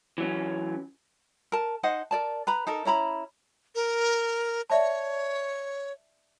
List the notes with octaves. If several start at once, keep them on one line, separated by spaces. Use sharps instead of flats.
E3 F#3 C#4
A#4 A5
D#4 C5 D#5 F#5
A#4 D5 A5
B4 A#5 B5
D#4 A4 A#4
C#4 E4 A#5 B5
A#4
C#5 D5 E5 A5